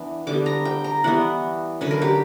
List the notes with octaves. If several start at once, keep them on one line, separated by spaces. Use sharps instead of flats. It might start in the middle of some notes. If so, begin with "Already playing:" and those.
Already playing: E3 B3 D4
D3 G3 B3 D6
A#5
G5
A#5
E3 G3 B3 F#5
D3 F#3 C#4 B4
A#4
G4